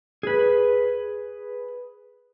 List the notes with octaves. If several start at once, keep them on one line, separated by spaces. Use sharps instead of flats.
G#4 B4